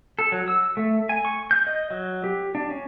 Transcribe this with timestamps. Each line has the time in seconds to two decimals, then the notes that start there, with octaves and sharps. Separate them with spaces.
0.19 A4
0.32 F#3
0.48 E6
0.77 A3
1.09 G#5
1.25 C#6
1.51 G6
1.67 D#5
1.91 F#3
2.24 G4
2.55 D4
2.70 C#4